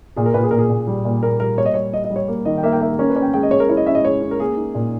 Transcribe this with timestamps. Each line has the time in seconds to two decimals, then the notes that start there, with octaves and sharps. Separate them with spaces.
0.16 A#2 G#4
0.26 A#4
0.34 A#2 B4
0.43 G#4
0.51 A#2 A#4
0.58 G#4
0.70 A#2
0.87 G3
1.05 A#2
1.23 A#3 A#4
1.40 G3 A#4
1.58 A#3 C#5
1.66 D#5
1.74 G3 C#5
1.93 G3 D#5
2.04 D#5
2.10 G3
2.16 C#5
2.28 A#3
2.45 D#3 D#5
2.57 G5
2.63 A#3 E5
2.72 G5
2.81 A#3 E5
2.99 C#4 A#4
3.10 B4
3.16 C#4
3.22 G5
3.34 G#3 G5
3.43 D#5
3.51 G#3 C#5
3.60 A#4
3.69 E4 C#5
3.77 D#5
3.86 C#4 E5
3.95 D#5
4.04 G#3 C#5
4.21 C#4
4.31 A#4
4.39 A#3 G#4
4.57 D#4
4.75 A#2